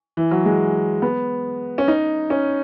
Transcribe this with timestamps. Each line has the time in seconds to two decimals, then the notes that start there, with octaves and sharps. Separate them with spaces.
0.17 E3
0.31 F#3
0.46 G#3
1.02 B3
1.78 C#4
1.88 D#4
2.30 C#4